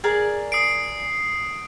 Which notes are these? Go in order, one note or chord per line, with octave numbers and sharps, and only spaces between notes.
G#4 A#4 D5
D#6 C7 D7